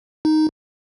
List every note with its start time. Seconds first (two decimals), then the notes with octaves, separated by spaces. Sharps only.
0.25 D#4